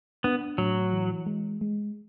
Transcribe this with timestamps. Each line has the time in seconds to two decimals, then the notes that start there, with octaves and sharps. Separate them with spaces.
0.24 B3 D4
0.58 A2 F#3
0.93 E3
1.26 G#3
1.61 G#3